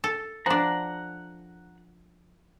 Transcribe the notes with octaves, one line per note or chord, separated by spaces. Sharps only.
A4
F3 D4 F#5 A#5